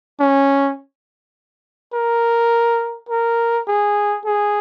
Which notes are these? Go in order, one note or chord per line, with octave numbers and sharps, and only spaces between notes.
C#4
A#4
A#4
G#4
G#4